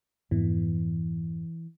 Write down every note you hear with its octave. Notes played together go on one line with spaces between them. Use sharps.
F2 G#2 E3 B3